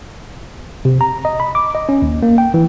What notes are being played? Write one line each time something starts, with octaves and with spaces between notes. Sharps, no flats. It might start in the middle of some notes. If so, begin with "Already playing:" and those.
C3
A#5
D#5
B5
D6
D#5
C#4
D#2
A#3
G5
E3